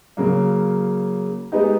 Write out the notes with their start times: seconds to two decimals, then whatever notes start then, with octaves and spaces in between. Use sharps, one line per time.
0.17 C#3 F#3 A#3
1.52 G#3 B3 D#4 G4